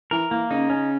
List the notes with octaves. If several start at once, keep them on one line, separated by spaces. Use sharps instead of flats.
E3 A#4
E3 A#3
C#3 D#4
C#4